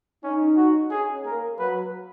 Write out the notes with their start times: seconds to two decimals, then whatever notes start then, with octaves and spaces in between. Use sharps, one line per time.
0.23 C#4 D#4
0.57 F#4
0.91 C#4 G#4
1.25 A#3 A#4
1.58 F#3 B4